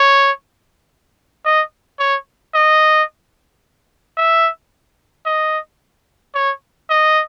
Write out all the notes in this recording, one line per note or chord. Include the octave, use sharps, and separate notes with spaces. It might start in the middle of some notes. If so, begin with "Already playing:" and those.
Already playing: C#5
D#5
C#5
D#5
E5
D#5
C#5
D#5